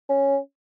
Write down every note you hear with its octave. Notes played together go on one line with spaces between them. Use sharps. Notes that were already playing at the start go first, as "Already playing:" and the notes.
C#4